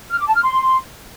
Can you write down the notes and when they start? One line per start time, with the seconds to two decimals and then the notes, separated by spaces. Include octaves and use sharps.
0.11 F6
0.19 D6
0.27 A5
0.35 F6
0.43 C6